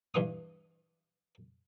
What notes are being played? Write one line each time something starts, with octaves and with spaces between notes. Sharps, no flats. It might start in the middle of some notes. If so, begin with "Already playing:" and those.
G2 E3 F5 D#6